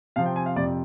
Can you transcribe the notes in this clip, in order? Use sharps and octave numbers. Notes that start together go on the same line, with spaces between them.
C3 F3 C4 F5
G5
G#5
F5
F2 C3 F3 D5